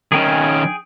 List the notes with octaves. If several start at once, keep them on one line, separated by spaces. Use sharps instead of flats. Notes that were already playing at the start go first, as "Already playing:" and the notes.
D#3 C#4 G#4 G5 G#5